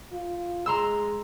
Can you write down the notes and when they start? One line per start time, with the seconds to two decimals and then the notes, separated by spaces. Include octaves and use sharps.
0.12 F4
0.66 G#3 A#5 C6 E6